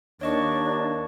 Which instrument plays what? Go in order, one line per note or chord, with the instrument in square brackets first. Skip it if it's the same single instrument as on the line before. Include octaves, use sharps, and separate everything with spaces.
[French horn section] D#2 [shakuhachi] D4 [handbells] C#5 D#5 C#6